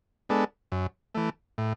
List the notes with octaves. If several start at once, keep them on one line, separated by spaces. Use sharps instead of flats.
G#3 B3 D4 A4
F#2
E3 A3
A2